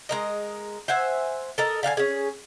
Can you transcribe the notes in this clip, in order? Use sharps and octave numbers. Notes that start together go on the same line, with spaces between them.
G#3 A#4 D#5
C5 E5 F#5 G#5
A4 A#4 D#5
D3 F5 G5 G#5
C#4 G#4